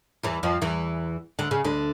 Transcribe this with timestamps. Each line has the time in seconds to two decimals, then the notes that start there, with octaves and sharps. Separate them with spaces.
0.23 E2 E3
0.43 F2 F3
0.62 E2 E3
1.39 D2 D3
1.51 C#3
1.64 D2 D3